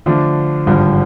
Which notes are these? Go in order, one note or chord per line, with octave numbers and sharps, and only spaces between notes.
D3 F3 A3 D4
G#1 G2 D3 F3